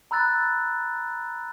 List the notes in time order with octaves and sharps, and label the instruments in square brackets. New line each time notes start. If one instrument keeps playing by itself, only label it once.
[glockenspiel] A#5 B5 E6 F#6 A6